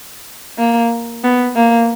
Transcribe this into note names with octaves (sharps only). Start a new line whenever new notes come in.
A#3
B3
A#3